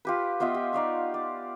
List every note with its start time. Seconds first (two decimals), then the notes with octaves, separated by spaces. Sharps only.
0.05 F4 G4 B4
0.40 B3 F4 D#5 E5
0.54 G4
0.73 D#4 D5 F5 C#6
1.14 D5